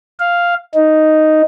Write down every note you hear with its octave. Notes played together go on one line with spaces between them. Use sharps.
F5
D#4